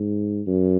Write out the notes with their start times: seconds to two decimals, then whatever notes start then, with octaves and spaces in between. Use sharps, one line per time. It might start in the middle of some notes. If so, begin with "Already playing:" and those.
Already playing: G#2
0.47 F#2